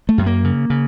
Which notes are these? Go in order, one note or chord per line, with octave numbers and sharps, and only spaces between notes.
A3
F#2
A#3
C#3
C#3